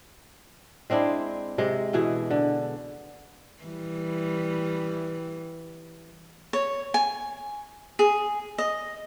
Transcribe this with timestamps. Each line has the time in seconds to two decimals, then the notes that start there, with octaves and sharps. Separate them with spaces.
0.90 G#3 C4 D4 E4
1.58 C3 G#3
1.93 B2 E3 G#4
2.31 D3
3.63 E3 G3
6.53 C#5
6.94 G#5
7.99 G#4
8.58 D#5